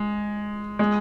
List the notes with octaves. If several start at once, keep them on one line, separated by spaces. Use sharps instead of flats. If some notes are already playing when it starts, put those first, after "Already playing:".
Already playing: G#3
G#3